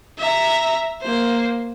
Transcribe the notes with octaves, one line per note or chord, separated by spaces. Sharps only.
E5 A#5
A#3 C5